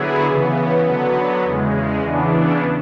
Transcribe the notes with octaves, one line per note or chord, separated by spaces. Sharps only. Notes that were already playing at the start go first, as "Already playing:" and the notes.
Already playing: D3 F#3 B3 E4 G#4
C#3 E3 B3
D3 F#3 B3
E2 C#3 G#3
E2 C#3 E3 B3 D4